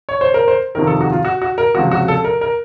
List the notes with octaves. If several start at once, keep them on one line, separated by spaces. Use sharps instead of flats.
C#5
C5
A#4
C5
F2 C3 D#3 A#4
A4
F#4
F4
F#4
F#4
A#4
C#2 C3 F3 F#4
F#4
A4
A#4
A#4